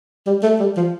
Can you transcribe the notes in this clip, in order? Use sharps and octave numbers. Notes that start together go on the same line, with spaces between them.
G3
A3
G3
F3